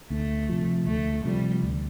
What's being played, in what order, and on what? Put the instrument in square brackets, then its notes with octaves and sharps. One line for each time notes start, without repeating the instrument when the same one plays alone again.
[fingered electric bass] D2 [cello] A3
[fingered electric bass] C3 F3
[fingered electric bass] D2 [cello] A3
[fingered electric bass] C3 F3 [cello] G3
[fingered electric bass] D2